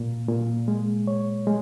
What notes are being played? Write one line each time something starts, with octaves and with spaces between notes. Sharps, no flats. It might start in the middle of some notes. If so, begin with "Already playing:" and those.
Already playing: A#2
A#2
G#3
C#5
G#3